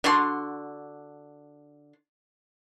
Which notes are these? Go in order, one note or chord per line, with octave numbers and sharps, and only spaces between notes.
D3 D4 F#4 C6